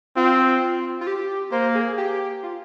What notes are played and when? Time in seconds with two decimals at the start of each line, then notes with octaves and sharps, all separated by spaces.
0.16 C4 F4
1.01 F4
1.07 G4
1.52 A#3 C5
1.75 G#4
1.98 G4
2.43 F4